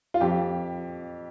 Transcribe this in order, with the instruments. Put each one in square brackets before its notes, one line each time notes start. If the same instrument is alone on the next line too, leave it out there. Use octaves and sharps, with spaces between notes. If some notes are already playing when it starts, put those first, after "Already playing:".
[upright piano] F4
F2 G4